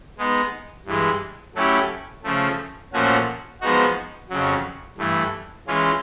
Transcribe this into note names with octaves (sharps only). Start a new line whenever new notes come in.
G#3 B3 D#4
G2 E3 G#3
F#3 A3 C#4 E4 G4
C#3 F3 A3
A#2 F3 A3 C#4 F#4
F3 G#3 B3 D#4 F#4
F2 C#3 F#3
G2 E3 A3
E3 G#3 C#4 F4